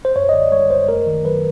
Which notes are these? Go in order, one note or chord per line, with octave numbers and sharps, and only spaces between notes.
C5
F#2 C#5
D#5
D3 D5
G3 C#5
F#2 C5
A3 A#4
D#3
F#3 B4